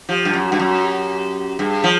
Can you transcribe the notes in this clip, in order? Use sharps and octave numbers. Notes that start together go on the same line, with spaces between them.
F3 G4
G2
F#2
F#4
G2
F#2
G4
G2 G#4
F3